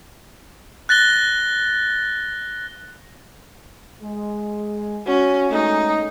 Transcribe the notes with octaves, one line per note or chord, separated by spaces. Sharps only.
F#6 A6 A#6 G7
G#3
C#4 F#4
G#3 A3 D#4